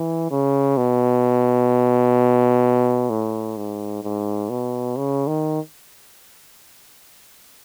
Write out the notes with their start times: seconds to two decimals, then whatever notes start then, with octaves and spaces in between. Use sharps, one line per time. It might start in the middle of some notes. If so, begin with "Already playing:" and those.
Already playing: E3
0.31 C#3
0.77 B2
3.10 A2
3.57 G#2
4.03 G#2
4.50 B2
4.97 C#3
5.27 D#3